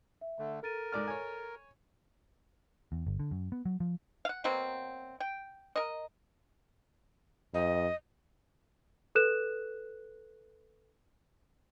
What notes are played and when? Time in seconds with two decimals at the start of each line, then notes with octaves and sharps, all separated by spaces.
0.21 E5
0.39 D3 A3
0.63 A4 A#4 A6 D#7
0.92 G#2 D5 F6
1.08 C#5 G#5
2.92 E2
3.07 G1
3.19 D3
3.31 F#2
3.52 B3
3.65 F#3
3.80 F3
4.25 F5 F#5
4.44 B2 F#3 A#3 C4
5.20 G5
5.76 A#4 D#5
7.54 F2 D#5
9.15 A4 B4 F#6 E7